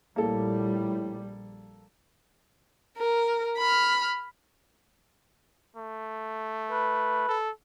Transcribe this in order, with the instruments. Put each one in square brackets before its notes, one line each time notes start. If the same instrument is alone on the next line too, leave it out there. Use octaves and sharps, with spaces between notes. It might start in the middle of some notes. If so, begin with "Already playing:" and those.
[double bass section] A#1 G3 [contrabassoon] A2 [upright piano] A#3 A4
[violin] A#4
B5 F6
[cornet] A3
[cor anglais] B4
[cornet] A4